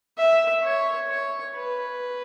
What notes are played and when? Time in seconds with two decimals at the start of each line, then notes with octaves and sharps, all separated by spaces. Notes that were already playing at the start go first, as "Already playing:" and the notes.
0.18 E5
0.63 C#5
1.10 C#5
1.56 B4